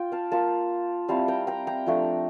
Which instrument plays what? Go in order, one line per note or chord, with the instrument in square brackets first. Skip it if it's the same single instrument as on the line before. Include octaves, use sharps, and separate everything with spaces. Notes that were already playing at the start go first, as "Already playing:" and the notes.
Already playing: [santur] F4 G5
F5 A5
A#3 F4 F5 A5
G3 C4 E4 F5 A5
G5 A#5
G5 A#5
G5 A#5
F3 A3 D4